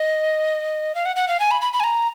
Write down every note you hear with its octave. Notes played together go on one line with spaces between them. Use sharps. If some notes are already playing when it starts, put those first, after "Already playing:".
Already playing: D#5
F5
F#5
F#5
F5
G#5
B5
B5
B5
G#5
A#5